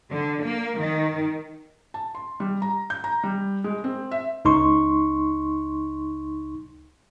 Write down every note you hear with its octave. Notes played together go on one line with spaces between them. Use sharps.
D3
A#3
D#3
A5
C6
G3
A#5
G6
A#5
G3
G#3
C4
E5
C#2 D#4 C6 C#6